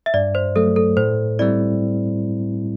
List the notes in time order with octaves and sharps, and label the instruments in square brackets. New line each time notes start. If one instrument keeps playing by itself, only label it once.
[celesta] E5
[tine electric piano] G2 [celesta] D5
[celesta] C5
[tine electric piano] F#3 A3 [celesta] A4
[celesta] A4
[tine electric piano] A2 [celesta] C5
[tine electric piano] G3 C4 E4 [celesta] D5